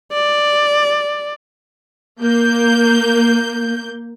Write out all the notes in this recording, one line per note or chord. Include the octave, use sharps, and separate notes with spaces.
D5
A#3 G6